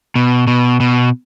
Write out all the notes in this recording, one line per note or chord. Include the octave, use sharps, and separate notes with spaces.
B2
B2
B2